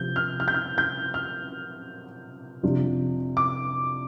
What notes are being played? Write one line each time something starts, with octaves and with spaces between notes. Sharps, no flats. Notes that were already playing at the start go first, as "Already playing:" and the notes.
Already playing: C3 F3 C4 G6
F6
F6
G6
F6
G6
F6
F2 C3 F3 D4
D6